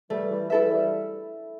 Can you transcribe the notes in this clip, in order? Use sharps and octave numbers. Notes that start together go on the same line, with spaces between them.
E3 G3 A3
E3 G3
E3 G3 E4 A4 E5
E3 G3